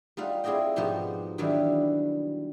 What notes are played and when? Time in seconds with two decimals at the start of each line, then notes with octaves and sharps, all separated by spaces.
0.17 G3 D#4 F4 F5 F#5
0.44 C4 E4 G#4 D5 D#5 G5
0.76 G#2 B2 F3 D#4 F#4 G4
1.38 D#3 E3 F#3 G3 D4 E4